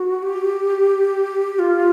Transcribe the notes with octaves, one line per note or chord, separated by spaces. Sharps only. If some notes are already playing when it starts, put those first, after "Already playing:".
Already playing: F#4
G4
F4